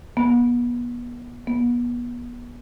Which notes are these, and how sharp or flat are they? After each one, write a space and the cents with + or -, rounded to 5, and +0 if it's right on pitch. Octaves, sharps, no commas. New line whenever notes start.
B3 -35
B3 -35